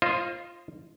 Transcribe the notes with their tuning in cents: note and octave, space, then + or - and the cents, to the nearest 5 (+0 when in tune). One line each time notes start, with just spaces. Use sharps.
F4 -10 C5 +35 D#5 +0